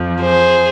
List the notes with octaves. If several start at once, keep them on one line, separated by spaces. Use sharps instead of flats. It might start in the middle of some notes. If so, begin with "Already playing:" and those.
Already playing: F2 F3
G#4 C5